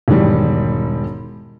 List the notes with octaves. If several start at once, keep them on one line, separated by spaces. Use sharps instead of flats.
E1 G#2 D#3 E3 G3